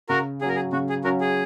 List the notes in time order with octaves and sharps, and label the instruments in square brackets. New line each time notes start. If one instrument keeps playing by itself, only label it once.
[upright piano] C#3 [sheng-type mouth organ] F#4 A#4
[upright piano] F#3 C#4 [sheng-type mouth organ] G#4
[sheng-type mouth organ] A#4
G#4
[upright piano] C#3 [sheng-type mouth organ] F#4
[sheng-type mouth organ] G#4
[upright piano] F#3 C#4 [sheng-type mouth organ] F#4 A#4
[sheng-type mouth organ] G#4